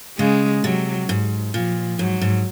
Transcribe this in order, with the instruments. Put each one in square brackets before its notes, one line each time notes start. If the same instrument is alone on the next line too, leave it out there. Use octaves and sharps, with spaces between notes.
[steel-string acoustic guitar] C#3 [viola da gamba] G#3
[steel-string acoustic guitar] C3 [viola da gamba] F#3
[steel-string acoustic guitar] G#2
[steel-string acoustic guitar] A#2 [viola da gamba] F3
[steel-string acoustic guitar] G#2 [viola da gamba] F#3
[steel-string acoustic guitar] G#2